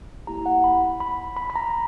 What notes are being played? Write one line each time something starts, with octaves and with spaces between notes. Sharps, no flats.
A#3 E4 G4 A#5
F#5
B5
B5
B5
B5
A#5